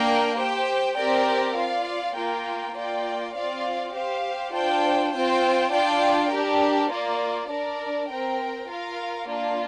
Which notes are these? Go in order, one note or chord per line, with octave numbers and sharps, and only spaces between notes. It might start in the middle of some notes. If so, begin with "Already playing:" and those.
Already playing: A#3 D4 A#4 G5
G4 C5 G5
C4 G4 A#4 D5 G5
F4 D5 F5
A#3 F4 A#4 G5
A#3 F4 D5 G5
C4 F4 D5 F5
G4 C5 F5
D4 F4 C5 G5
C4 F4 C5 G5
D4 F4 D5 G5
D4 G4 A#4
A#3 F4 D5
D4 A#4 D5
C4 A#4 G5
F4 A#4 F5
A#3 D4 F4